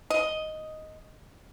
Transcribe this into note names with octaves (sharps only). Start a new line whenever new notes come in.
D#5